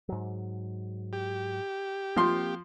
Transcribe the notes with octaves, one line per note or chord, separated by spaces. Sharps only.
G#2 F#3
G4
F3 A#3 C4 C6